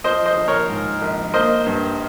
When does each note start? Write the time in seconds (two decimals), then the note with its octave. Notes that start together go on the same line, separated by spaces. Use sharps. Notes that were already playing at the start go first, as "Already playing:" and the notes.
0.04 F3 C5 D#5
0.26 C5 D#5
0.37 A#1
0.48 A#4 C#5
0.69 G#2
1.02 A#1
1.34 A#3 C5 D#5
1.66 G2